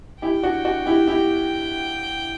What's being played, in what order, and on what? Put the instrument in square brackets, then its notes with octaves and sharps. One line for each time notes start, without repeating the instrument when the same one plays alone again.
[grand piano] E4 G4 [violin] G5
[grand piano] D4 F#4
D4 F#4
E4 G4
E4 G4